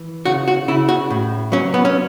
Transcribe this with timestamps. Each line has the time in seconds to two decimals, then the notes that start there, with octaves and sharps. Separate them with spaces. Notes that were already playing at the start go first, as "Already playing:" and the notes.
Already playing: E3
0.25 C#3 F#4
0.48 F#4
0.68 C#3 E4
0.89 F#4
1.10 A2
1.52 F#3 C#4
1.74 B3
1.85 C#4